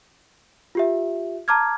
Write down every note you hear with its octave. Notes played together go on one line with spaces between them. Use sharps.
F4 G4 E5
A5 A#5 D6 F6 G#6